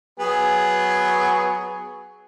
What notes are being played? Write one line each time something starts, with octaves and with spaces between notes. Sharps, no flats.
F#3 B3 G#4